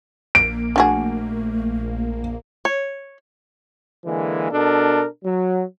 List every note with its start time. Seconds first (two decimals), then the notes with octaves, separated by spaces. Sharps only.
0.35 A#1 A#3 D7
0.76 A3 D4 F#4 G#4
2.65 C#5
4.05 D3 E3 G#3 A#3
4.52 B2 D4 A4 A#4
5.24 F#3